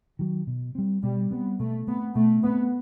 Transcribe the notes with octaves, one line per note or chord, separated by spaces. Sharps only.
D#3 F#3
B2
G3 C4
B2 G3
G3 B3 C4
B2 A3
A3 B3 C4
B2 A3
A3 B3 C4